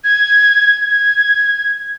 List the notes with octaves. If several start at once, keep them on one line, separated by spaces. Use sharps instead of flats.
G#6
G#6